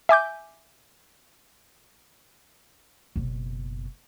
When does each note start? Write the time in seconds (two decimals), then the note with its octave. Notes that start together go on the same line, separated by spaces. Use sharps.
0.09 E5 G#5 D6 G6
3.16 F#1 B2